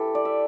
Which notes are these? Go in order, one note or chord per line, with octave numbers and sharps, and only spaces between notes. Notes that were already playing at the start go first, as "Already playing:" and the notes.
Already playing: E3 G4 A4
D5
E5